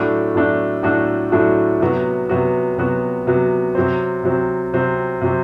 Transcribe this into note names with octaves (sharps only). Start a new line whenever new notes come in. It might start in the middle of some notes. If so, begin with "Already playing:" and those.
Already playing: A2 F#3 A3 D4 F#4
A2 F#3 A3 D4 F#4
A2 F#3 A3 D4 F#4
A2 F#3 A3 D4 F#4
C3 F#3 B3 F#4
C3 F#3 B3 F#4
C3 F#3 B3 F#4
C3 F#3 B3 F#4
C3 F#3 C4
C3 F#3 C4
C3 F#3 C4
C3 F#3 C4